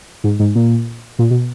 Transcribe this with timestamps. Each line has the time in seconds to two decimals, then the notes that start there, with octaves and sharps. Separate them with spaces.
0.24 G#2
0.39 G#2
0.55 A#2
1.19 A#2
1.30 B2